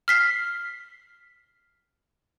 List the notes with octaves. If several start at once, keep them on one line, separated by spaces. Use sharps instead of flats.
F6 B6 C7